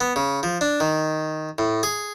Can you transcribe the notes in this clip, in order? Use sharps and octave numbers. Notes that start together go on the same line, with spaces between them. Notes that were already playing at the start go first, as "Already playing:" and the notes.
B3
C#3
F3
D4
D#3
A2
G#4